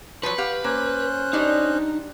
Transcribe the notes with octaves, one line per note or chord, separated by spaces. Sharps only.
F3 F#3 B4
G4 F5 F#5
A#3 C#4 C5 F#6
G3 D4 D#4 F#4